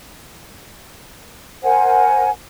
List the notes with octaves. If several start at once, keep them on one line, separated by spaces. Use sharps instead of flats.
A#4 C5 F#5 G#5